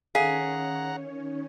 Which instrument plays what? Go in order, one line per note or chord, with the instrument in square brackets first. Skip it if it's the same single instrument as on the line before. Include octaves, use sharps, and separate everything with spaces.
[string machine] D#3 C#4 C#5 [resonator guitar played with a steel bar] G#4 [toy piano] F5 [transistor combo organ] F#5 A#5